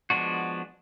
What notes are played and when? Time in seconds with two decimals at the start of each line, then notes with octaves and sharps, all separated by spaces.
0.10 F3 G#3 B3 D4 F#4